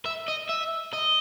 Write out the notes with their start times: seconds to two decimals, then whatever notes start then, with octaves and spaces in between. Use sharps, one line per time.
0.06 E5
0.28 D#5
0.49 E5
0.93 D#5